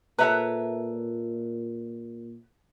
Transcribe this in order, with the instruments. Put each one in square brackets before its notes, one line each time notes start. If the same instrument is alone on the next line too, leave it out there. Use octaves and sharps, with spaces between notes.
[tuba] A#2 [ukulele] A4 A#5 [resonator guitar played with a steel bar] B4 C#5 E5